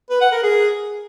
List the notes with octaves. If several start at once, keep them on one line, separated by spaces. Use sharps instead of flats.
B4
F#5
A#4
G#4